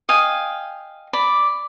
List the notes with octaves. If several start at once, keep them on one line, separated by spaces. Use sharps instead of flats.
D#5 F5 G5 G#5
D5 B5